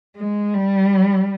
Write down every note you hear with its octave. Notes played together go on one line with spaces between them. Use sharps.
G#3
G3